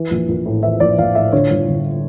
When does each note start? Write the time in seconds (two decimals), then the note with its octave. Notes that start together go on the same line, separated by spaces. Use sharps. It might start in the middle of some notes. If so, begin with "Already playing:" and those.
Already playing: E3
0.11 A#1
0.28 A#1
0.46 A2
0.63 E3 E5
0.80 A#1 D5
0.98 A#1 F5
1.15 A2 E5
1.32 D3 C#5
1.50 G1
1.68 G1